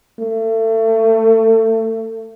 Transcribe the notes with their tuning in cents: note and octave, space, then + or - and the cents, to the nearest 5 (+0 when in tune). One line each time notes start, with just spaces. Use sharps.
A3 +30